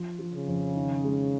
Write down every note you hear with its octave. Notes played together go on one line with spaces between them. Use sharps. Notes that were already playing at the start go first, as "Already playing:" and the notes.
Already playing: F3
F3
C#3
F2
D#3
G#3